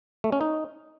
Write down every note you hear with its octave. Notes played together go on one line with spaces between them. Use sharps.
A3
C#4
D#4